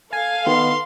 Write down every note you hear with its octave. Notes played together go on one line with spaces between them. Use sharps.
A4 F5 G#5
D#3 B3 C6